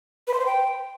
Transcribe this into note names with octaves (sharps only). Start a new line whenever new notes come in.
B4
C6
C5
G5